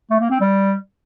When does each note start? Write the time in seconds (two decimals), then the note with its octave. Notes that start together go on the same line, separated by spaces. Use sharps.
0.10 A3
0.20 A#3
0.30 C4
0.40 G3